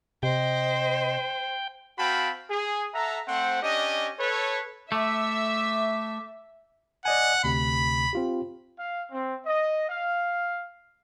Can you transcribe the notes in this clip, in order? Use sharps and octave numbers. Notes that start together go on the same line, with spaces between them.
C3 C5 D#5 G5
C4 F#4 F5 G5 A5 B5
G#4
A4 E5 F#5 A#5
A3 C4 C5 F#5
C#4 D4 G4 D#5
A4 B4 C#5
A3 E5 D6
D5 D#5 F#5 G#5
D2 C3 B5
C4 F4 G4
F5
C4
D#5
F5